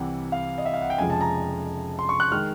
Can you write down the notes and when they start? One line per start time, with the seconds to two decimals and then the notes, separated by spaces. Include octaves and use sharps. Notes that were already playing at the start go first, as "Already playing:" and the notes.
Already playing: C2 C3 E3 F#5
0.32 F5
0.58 D#5
0.66 E5
0.74 F5
0.82 F#5
0.90 G5
0.98 F1 F2 C#3 F3 G#3 G#5
1.10 A5
1.21 A#5
1.99 C6
2.09 C#6
2.20 F#6
2.32 D#3 G#3 F6